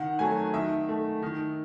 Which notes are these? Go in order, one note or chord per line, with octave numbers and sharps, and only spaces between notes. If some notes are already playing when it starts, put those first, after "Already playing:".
Already playing: D#3 F#5
F#3 A3 G#5
D#3 E5
A3
D#3